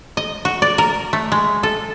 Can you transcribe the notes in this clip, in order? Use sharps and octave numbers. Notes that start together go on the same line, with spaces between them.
D#5
F#4
D5
A#4
A3
G#3
A4